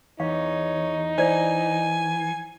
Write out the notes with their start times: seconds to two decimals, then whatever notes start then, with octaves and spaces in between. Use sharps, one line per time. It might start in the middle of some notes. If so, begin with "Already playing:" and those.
0.20 E2 D#4 C#5 F5
1.18 E3 C5 D5 G#5